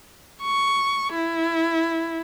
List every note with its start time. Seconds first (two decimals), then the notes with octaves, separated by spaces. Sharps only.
0.42 C#6
1.13 E4